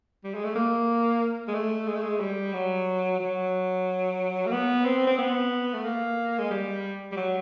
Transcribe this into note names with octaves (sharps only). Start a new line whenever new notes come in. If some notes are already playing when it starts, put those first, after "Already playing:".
G3
G#3
A3
A#3
G#3
A3
G#3
A3
G#3
G3
F#3
F#3
A#3
B3
C4
C4
B3
A3
A#3
G#3
G3
G3
F#3